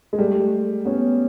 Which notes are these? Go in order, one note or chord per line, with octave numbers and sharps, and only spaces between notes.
G#3
G3 A3
B3 C#4